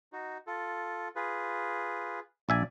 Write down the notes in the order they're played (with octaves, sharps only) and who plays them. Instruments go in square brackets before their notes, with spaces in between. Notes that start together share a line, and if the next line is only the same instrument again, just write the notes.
[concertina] D#4 F#4
F4 A4
F4 G#4 B4
[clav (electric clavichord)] A#1 E5 G#5 [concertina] D5